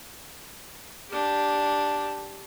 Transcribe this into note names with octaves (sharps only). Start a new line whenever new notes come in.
D4 G4